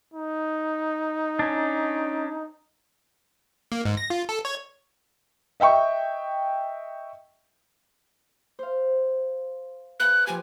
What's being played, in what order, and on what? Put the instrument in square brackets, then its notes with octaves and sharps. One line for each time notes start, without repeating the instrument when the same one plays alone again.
[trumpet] D#4
[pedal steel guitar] C#4 D4
[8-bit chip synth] A#3
G#2
A#6
F4
A4
C#5
[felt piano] D#5 E5 G5 C#6
[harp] C5 F5
[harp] B4 F5 G#5 [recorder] F#6
[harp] F3 G4 [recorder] G#5